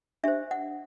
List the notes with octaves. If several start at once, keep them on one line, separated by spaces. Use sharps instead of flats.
D4 G4 C5 E5
F#5